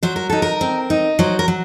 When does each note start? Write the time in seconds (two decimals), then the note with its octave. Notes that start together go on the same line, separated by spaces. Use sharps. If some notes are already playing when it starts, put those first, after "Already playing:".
0.03 F#3 C5
0.16 A#4
0.29 D#4 A4
0.42 A#4
0.61 C4
0.90 D#4
1.19 F#3 C5
1.39 A#4
1.48 F#3